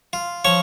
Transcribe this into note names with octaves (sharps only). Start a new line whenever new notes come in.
F4
F3 C#5